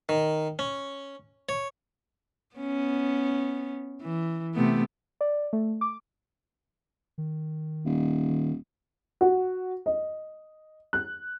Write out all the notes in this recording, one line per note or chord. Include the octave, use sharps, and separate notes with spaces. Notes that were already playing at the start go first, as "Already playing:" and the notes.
D#3
C#4
C#5
B3 C#4
E3
C3 A3 B3
D5
A3
D6
D#3
D#1
D#3
F#4
D#5
F#6